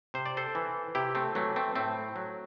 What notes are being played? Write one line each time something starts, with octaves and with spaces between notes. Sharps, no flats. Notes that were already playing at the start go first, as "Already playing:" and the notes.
C3 C5
D5
A4 C5
E3
C3 E4 G4
A3 C4
E3 F#3 A3
A3 C4
A2 A3 C4
F#3